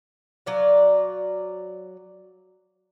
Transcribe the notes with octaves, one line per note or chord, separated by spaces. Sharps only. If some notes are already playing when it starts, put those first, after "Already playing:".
F#3 D5 F5